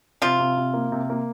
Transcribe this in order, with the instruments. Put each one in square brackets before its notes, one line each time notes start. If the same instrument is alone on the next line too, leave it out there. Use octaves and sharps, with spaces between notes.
[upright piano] C3 [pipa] F3 F4
[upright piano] C3
C3
A#3
C3
A#3